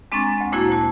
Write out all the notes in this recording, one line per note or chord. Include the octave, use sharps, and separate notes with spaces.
G#3 C4 D4 A#5 C#6 A6
D2 C4
A#2 A3 A#3 E4 F#4 G#6
C5 A5